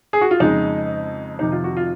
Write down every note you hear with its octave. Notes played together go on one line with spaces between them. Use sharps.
G#4
F#4
F4
F2 C#3 G#3 D#4
F2 C3 D#3 D#4
F4
F#4
F4